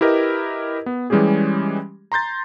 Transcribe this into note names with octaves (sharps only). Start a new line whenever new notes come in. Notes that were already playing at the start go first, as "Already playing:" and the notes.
E4 G4 A#4 B4 D#5
B3
E3 G3 G#3 C#4 G4 G#4
A#5 C6 G6 A6